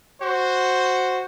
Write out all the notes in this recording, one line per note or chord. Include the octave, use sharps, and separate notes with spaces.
F#4 C5